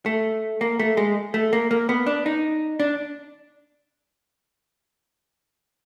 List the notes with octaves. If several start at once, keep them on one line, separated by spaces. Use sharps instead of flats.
A3
A#3
A3
G#3
A3
A#3
A#3
B3
D4
D#4
D4